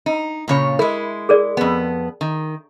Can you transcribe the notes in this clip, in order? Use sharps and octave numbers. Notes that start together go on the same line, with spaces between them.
D#4
A#2 C#3 C#5
G#3 E4 A#4
G#4 A#4 D5
F2 B3
D#3